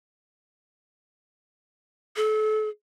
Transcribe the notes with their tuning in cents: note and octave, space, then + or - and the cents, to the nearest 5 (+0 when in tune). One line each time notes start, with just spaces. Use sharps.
A4 -35